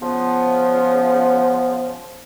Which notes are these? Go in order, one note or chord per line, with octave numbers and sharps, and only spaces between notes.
C#3 F3 B3